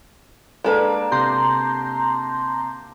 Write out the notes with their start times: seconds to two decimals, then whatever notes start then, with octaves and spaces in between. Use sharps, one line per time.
0.64 G#3 A#3 D4 G4 A4 B4
1.12 C3 A#5 C6 G6